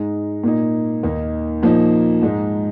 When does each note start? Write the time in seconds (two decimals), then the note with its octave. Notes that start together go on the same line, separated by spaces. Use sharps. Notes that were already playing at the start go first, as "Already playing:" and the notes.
Already playing: G#2 G#3 D#4
0.44 A#2 A#3 D#4
1.03 D#2 D#3 A#3 D#4
1.63 A#2 F3 A#3 D#4
2.22 G#2 G#3 D#4